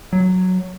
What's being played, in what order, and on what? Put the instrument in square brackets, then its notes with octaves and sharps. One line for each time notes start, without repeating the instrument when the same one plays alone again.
[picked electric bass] F#3